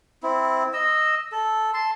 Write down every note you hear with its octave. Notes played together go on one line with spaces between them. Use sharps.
C4 E4
D#5 E6
A4
A5 C6